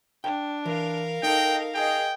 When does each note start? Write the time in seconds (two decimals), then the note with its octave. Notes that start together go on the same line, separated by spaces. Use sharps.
0.24 D4 G5
0.66 E3 A#4 F5
1.23 D#4 A4 D#5 G5
1.75 G#4 D#5 G5